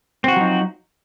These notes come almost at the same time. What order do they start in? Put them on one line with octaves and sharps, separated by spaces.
C4 F#4 F3 F#3 D#4